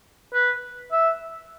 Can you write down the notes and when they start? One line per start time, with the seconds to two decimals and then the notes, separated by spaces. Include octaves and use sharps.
0.34 B4
0.92 E5